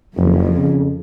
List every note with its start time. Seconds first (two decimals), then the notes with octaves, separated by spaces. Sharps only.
0.17 F#1 F2
0.58 C#3